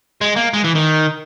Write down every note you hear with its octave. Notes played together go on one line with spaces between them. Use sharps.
G#3
A#3
G#3
E3
D#3